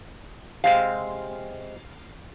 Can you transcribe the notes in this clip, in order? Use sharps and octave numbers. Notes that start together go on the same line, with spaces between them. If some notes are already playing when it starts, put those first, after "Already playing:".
C3 G#3 C4 F5